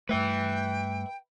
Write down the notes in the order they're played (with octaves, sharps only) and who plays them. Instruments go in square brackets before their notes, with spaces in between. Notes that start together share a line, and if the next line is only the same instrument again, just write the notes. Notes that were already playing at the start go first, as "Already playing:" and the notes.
[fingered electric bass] G2 A3 [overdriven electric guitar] B4 E5 [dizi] G5